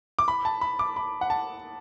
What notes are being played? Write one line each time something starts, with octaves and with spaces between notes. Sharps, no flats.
D6
B5
A5
B5
D6
B5
F#5
A5